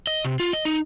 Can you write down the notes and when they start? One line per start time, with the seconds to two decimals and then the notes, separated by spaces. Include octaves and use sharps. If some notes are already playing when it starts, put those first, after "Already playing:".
0.07 D#5
0.24 C3
0.40 F4
0.53 D#5
0.65 D#4